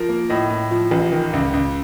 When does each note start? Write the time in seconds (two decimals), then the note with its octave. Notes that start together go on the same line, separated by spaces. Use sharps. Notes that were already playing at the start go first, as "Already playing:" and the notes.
Already playing: F3 A#4
0.09 A#3
0.30 A2 D#5
0.50 A2
0.71 F3
0.91 A1
1.12 D#3
1.33 C#2
1.53 C#2